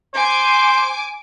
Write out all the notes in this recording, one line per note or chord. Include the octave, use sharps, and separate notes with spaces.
C5 G#5 D6